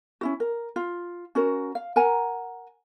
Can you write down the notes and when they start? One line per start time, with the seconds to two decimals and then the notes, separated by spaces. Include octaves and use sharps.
0.21 C#4 E4 F#4
0.40 A#4
0.76 F4
1.35 C#4 F#4 A#4
1.75 F5
1.96 A#4 F#5 G#5 A#5